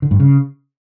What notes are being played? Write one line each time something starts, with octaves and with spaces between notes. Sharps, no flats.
D3
G2
C#3